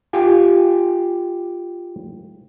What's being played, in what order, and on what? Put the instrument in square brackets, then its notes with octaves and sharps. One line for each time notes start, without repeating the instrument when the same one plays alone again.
[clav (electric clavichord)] F4 G4 G#5